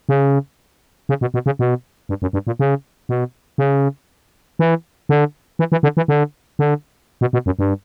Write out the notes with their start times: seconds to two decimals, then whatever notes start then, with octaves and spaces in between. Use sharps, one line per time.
0.09 C#3
1.09 C#3
1.21 B2
1.34 B2
1.46 C#3
1.59 B2
2.09 G2
2.22 F#2
2.33 G2
2.47 A#2
2.59 C#3
3.09 B2
3.58 C#3
4.59 E3
5.09 D3
5.59 E3
5.72 E3
5.83 D3
5.97 E3
6.08 D3
6.59 D3
7.21 B2
7.33 B2
7.46 F#2
7.59 G2